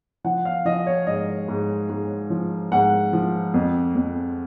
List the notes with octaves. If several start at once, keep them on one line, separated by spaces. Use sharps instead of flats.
F3 F#5
F5
F3 D#5
C#5
G#2 D#5
G#2
G#2
F3
G#2 F#5
F3
F2
F2